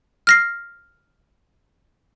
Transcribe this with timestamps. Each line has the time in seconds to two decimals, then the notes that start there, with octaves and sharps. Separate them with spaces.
0.27 F6 A#6 C7